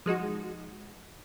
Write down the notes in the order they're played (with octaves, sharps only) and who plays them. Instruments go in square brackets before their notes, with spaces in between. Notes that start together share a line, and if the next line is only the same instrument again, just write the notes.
[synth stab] F3 G#3 D#4 F#4